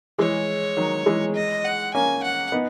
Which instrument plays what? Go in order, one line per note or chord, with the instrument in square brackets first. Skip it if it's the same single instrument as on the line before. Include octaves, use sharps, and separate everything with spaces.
[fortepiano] E3 G#3 [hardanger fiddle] C#5
[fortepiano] D#3 F#3
E3 G#3
[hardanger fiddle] D#5
F#5
[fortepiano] A#3 C#4 [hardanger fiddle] G#5
[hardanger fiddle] F#5
[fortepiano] B3 D#4